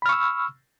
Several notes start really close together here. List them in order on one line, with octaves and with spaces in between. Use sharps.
B5 F6 C#6 E6